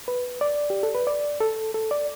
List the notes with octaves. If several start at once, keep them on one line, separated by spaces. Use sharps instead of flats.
B4
D5
G4
A4
B4
D5
A4
A4
D5